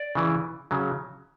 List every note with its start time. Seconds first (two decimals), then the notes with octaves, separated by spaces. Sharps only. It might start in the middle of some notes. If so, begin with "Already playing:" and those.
Already playing: D5
0.15 C#3 E3
0.71 C#3 F#3